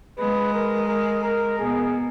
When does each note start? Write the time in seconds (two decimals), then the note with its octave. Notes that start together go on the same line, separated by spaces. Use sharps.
0.18 G#3 B4
0.54 A#4
0.88 A#4
1.24 A#4
1.59 B2 G#4